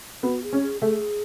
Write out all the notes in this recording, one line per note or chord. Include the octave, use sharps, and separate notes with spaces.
B3 F#4
G#4
C#4
G#4
A3 G#4